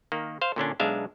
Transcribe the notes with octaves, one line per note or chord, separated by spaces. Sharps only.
D#3 A#3
C5 F5
A#2 D3 C#4 D4
B1 G#3 D4 E5 F5